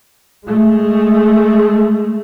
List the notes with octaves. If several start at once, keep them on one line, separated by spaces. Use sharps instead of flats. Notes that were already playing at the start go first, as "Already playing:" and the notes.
G#3 A3